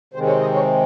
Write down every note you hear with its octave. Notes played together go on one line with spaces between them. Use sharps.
C3 D#3 G#3 C4 C5
C#5
D#5
C#5